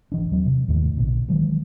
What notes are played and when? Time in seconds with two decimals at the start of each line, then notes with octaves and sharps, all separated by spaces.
0.12 G#1 E3 D4
0.31 D#2 F#3 C4
0.46 C3
0.68 D#2 G#2 D#3 A3
0.97 A#1 B2 D3
1.28 D#3 E3 F#3 G#3